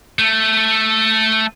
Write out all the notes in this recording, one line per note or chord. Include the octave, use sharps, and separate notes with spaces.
A3